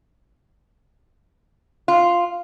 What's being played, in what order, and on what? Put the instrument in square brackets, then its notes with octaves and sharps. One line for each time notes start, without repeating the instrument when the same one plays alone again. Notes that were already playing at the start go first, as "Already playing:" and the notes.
[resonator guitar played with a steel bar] F4